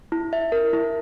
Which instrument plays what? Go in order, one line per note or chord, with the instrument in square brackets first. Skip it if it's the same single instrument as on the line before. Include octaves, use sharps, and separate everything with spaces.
[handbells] E4
E5
A#4
E4